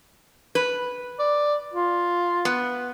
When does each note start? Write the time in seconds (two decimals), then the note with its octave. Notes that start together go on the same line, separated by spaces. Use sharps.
0.55 B4
1.19 D5
1.73 F4
2.45 B3